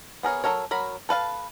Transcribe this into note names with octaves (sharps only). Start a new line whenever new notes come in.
B3 G#4 A#4 C#5
F#3 F4 A4 A#4 C#5
F#3 A#4 B5
A4 B4 F5 A5